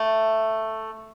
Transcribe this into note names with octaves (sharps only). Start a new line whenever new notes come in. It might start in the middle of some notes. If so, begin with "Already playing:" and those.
Already playing: A3